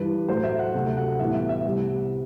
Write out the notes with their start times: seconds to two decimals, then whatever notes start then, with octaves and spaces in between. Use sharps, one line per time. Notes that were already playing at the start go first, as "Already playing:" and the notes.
Already playing: G2 E3 G3 B4
0.29 A2 F#3 A3 C5
0.44 E5
0.59 F#5
0.74 D2 C3 F#3 A3
0.97 F#5
1.19 A2 E3 G3 B3 E5
1.34 E5
1.49 E5
1.64 C2 C3 G3 B3